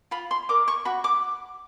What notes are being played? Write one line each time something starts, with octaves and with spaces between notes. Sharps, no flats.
F4 B5
C6
A#4 D5 D6
C#6
F#4 B5
D6